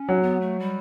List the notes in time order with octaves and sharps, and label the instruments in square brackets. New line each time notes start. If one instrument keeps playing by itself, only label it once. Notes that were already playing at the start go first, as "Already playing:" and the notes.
Already playing: [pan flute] C#4
[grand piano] F#3
[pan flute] B3
A3
G3